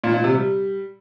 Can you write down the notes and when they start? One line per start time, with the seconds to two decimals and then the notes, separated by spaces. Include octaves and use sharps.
0.04 A#2
0.14 A#2
0.24 C3
0.34 G3